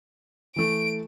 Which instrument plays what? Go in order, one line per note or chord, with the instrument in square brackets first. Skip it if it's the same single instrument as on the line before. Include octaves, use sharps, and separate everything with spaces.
[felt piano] E3 A3 [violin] D7